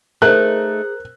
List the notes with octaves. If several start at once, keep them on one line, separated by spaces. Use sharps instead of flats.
A3 D#4 G#4 A#4 C5 F#6